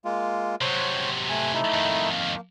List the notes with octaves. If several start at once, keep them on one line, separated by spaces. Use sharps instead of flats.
G#3 A#3 F4
C3 F#3 C5 C#5
A3 G#5
A3 D#4 E4
F2 D#3
A#3